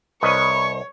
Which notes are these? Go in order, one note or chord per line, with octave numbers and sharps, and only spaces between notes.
C2 B4 C#5 D#5 C#6